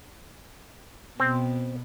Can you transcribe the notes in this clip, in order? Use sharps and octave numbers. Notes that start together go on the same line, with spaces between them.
B2 C4